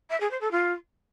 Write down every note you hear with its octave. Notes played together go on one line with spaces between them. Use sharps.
E5
G#4
C5
A4
F4